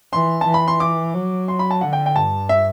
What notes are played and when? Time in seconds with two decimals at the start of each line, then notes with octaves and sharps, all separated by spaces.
0.13 E3 C6
0.41 A5
0.47 E3
0.54 B5
0.68 C6
0.80 D6
1.14 F#3
1.48 C6
1.59 B5
1.71 A5
1.81 D3 F#5
1.93 G5
2.06 G5
2.15 G2 A5
2.49 E5